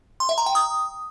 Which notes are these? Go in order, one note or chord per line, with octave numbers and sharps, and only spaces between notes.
C6
E5
A#5
G5
D#6